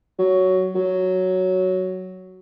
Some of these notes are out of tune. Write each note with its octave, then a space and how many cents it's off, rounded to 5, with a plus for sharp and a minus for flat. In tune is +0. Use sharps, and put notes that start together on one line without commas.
F#3 +10
F#3 +5